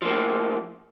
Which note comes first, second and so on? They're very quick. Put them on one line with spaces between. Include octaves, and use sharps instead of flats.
F3 A#3 A2